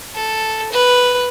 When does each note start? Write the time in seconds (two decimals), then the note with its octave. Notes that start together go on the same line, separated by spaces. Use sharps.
0.15 A4
0.72 B4